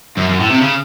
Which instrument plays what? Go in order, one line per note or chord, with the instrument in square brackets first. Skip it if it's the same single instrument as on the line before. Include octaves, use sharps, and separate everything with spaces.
[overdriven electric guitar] F#2
F#2
A2
C3
C#3